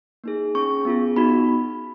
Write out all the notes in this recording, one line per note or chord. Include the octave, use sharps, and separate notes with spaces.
A#3 D#4 G#4
C#4 G#4 C#6
B3 F4 G#4
B3 D#4 F#4 B5